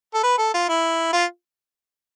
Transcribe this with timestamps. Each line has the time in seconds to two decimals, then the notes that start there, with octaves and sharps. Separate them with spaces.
0.14 A4
0.23 B4
0.38 A4
0.54 F4
0.68 E4
1.13 F4